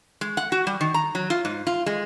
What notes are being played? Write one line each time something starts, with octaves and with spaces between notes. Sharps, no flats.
G#3
F#5
F#4
G3
D#3
A#5
F#3
F4
G#2
F4
G#3